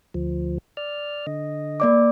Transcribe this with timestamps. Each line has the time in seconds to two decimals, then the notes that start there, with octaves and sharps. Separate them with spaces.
0.14 D2 F3
0.77 D5 F6
1.27 D3 D#5
1.80 A#3 D5 D6